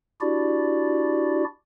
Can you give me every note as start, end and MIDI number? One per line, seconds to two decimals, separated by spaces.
0.21 1.44 62
0.21 1.44 64
0.21 1.44 66
0.21 1.44 67
0.21 1.44 74